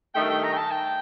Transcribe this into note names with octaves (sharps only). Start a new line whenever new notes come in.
G2 D#3 A3 G5
G5
A#5
G5
A5
G5